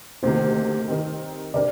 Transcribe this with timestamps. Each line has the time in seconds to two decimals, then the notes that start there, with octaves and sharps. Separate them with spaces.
0.23 D2 C3 D#3 A#3 C5
0.88 D#3 G3 C4 D#4 A#4
1.54 C3 G3 D4 G4 A#4 D5